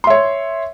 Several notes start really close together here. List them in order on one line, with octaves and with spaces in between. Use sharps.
C6 E5 C#5